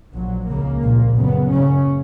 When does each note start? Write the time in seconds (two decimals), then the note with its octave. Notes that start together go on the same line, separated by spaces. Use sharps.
0.14 A#1 A#2 F#3
0.48 C#2 C#3 A#3
0.82 A#1 A#2
1.16 F#1 F#2 C#3 B3
1.51 F#1 F#2 C#3 C#4